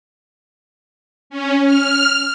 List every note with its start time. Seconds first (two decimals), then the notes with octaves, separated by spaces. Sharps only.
1.30 C#4
1.64 F6